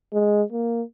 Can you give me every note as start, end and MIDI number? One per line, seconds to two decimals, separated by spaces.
0.13 0.42 56
0.52 0.82 58